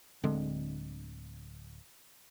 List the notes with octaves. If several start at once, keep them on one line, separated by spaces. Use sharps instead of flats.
D1 D3 G#3 C4